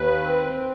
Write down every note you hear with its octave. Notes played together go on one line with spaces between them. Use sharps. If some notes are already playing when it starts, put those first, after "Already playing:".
Already playing: D#2 B4
C4